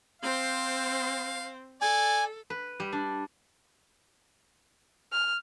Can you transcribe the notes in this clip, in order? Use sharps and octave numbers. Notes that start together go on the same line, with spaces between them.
C4 C5 F5
A4 D5 G#5
B4
G3
D4
F6